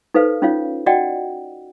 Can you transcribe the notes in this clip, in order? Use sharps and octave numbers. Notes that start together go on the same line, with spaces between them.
D#4 A4 B4 C5 F5
C#4 D#4 F4 C#5 F5
F#4 D5 D#5 F#5 G5 A5